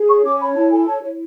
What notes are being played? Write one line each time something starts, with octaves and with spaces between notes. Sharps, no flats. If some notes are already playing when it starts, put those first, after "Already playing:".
Already playing: G#4
C#5 C#6
C#4 D6
C#5 B5
E4 A5
A4 G#5
C#5 A5
E4 C#5